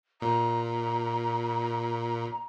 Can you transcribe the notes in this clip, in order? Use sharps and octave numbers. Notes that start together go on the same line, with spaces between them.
A#2 A#5